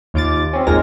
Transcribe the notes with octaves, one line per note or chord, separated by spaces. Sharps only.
D#2 F4 D6 A6
C4 C#4
G#1 D#2 A#2 G#3 A#4 A#6